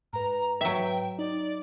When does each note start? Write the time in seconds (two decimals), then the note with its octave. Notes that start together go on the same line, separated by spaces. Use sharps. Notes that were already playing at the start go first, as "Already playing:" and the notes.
0.13 G#2 B4 A#5
0.61 F#3 E5 G5
1.19 D#4 D5